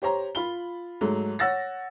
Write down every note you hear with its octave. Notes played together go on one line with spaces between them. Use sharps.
G4 C5 C#5 A#5
F4 B5 G7
G#2 F#3 A3
C#5 F#5 E6 A6 A#6